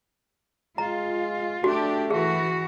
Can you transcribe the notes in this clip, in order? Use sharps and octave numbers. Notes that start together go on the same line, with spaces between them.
G#3 F4 A#5
A3 D4 F#4 G4
E3 F#4 G#4